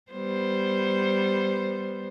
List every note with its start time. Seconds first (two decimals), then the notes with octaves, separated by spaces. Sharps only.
0.12 G3 B3 C5